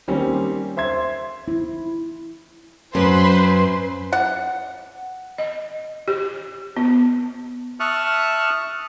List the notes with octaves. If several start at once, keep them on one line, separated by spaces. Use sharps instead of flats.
D#3 G3 A#3 C4 C#4
C5 E5 C6 G#6
E4
F#2 B4 C5 C6
F#5
D#5
G4
B3
E5 A5 C#6 D#6 F6 F#6